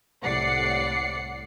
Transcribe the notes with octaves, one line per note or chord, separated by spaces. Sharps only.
C2 A2 D5 F#5 C7 C#7